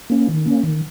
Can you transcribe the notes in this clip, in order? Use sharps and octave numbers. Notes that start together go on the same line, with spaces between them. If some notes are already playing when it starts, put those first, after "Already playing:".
A#3 C#4
D#3
A#3 C#4
D#3